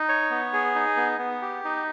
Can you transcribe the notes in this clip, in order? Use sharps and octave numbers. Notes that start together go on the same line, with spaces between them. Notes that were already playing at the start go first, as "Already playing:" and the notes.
Already playing: D#4
C#5
B3
G#4
D#4
B3
B3
G4
D#4